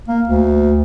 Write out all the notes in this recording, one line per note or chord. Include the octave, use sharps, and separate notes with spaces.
A#3
D2